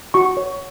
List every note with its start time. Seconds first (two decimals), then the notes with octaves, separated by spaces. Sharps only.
0.14 F#4 C#6
0.37 C#5